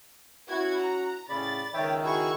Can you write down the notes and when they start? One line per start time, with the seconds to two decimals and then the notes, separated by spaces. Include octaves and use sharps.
0.48 C#4 E4 F#4 G#6
0.80 A#5
1.29 A2 C#3 D5 B5 A6
1.74 C#2 D#3 C#5 E5 G5
2.04 E4 F#4 G#4 C#6 E6 G#6